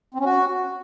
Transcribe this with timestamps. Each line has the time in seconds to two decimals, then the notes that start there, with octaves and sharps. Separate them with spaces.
0.14 C4
0.20 C#4
0.25 F#4